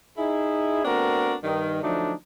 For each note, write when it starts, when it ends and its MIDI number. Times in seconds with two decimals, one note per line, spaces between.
0.18 0.82 63
0.18 0.82 64
0.18 0.82 68
0.85 1.35 57
0.85 1.35 59
0.85 1.35 60
0.85 1.35 62
0.85 1.35 66
0.85 1.35 70
1.44 1.80 43
1.44 1.80 51
1.83 2.13 50
1.83 2.13 53
1.83 2.13 54
1.83 2.13 57
1.83 2.13 62
1.83 2.13 63